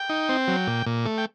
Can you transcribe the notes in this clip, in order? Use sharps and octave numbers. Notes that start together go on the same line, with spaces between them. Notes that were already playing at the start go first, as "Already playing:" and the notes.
Already playing: G5
D#4
C4
F#3
A#2
A#2
A3
G5